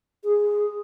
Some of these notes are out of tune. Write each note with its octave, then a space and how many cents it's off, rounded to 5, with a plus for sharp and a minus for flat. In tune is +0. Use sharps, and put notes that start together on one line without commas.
G#4 -5